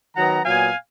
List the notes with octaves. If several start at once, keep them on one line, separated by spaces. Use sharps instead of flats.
D#3 F#3 B3 F#5 A#5
A#2 F#3 B3 F5 G#5